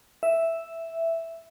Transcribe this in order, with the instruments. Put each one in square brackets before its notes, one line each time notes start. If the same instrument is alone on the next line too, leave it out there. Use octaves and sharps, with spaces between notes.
[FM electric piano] E5